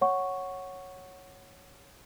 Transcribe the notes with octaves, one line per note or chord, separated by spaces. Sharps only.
C#5 F#5 C#6